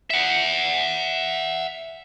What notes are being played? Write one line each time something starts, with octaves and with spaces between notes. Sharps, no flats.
E5 F#5